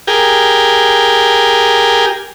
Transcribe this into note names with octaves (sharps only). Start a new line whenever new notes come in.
G4 G#4 A#4